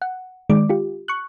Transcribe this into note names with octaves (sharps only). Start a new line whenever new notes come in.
F#5
D#3 G#3 D5 D6
F4 G4
C#6 F#6